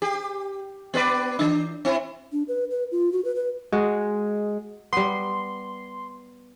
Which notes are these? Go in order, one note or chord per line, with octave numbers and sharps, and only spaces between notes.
G4
B3 B4 D5
E3 F3 D4
C4 E4
D4
B4
B4
F4
F#4
B4
B4
G#3 F#4
G3 B3 C6